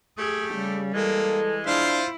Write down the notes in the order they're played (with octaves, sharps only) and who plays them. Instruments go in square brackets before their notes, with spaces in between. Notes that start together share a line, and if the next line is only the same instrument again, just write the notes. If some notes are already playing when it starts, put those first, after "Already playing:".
[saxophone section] A3 G4 [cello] G#4
[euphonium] C#3 [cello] G3
[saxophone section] E3 G#3 [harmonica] A#3 [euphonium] A4
[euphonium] D4 [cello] E4 [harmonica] F4 C5 F5